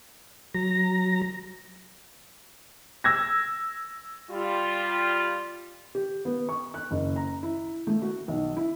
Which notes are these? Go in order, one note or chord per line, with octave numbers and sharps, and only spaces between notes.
F#3 A#5 A#6
E6 G#6 A#6
G3 F4
G4
B3
C#6
F#6
F#1
A#5
E4
A3
F#4
B1
E4